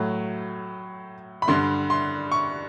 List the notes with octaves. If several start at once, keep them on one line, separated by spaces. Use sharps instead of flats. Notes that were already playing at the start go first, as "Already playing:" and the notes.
Already playing: A2 F#3 A3
B5
G2 D3 G3 C6
C6
C#6